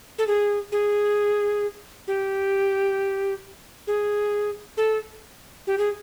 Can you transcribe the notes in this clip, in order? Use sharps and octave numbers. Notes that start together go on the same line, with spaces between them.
A4
G#4
G#4
G4
G#4
A4
G4
G#4